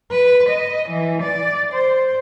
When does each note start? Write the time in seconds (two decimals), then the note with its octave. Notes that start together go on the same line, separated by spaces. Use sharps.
0.11 B4
0.49 D#5
0.89 E3
1.22 D5
1.72 C5